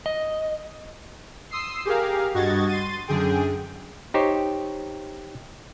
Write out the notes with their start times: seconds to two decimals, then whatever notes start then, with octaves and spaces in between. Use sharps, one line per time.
0.06 D#5
1.51 C6 D#6 E6 C7
1.85 G4 G#4 A#4 F5
2.34 G2 F#4 D#5 G#6 A6
2.69 C6 A6 D#7
3.08 F#2 D3 G#4 G5
4.14 D#4 G4 C5 C#5